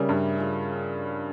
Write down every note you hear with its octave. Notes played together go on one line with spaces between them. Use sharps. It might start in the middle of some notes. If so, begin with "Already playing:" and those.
Already playing: C#3 G3 C#4 E4 A#4
G2
C#4 F4 G#4